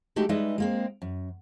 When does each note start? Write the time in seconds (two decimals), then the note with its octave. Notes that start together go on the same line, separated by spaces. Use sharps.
0.16 G#3 A3 D#4 F#4 G4
0.29 G3 G#3 D#4 B4 D#5 E5
0.58 G#3 A#3 C4
1.02 F#2